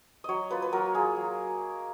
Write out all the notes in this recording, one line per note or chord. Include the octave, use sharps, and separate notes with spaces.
F#3 C#5 D#5
A#3 F4 B4
B4
F#3 A#4
A#3 F4 G#4
F#3